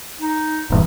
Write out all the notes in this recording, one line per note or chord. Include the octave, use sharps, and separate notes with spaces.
D#4
D#1 E2 G2